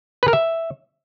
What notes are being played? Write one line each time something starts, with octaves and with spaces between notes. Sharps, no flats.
B4
A#4
E5